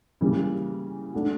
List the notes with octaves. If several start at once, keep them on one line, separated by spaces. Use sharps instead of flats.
C#3 E3 G3 A#3
F#3 A3 D4